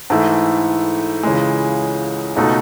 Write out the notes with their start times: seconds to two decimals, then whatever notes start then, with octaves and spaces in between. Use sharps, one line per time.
0.10 G#2 E3 A3 E4
1.23 C#2 C#3 E3 G#3
2.36 C#2 B2 A3 D#4